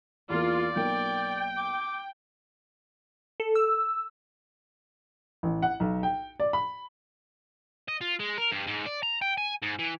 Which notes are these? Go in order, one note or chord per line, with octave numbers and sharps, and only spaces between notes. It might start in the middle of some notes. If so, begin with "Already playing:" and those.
E2 A#3 F4 D5
B1 A#3 G5 D7
D6
A4
E6
A1
F#5
B1
G5
D5
B5
D#5
F4
G#3
A#4
G2
G#2
D5
A#5
G5
G#5
G#2
E3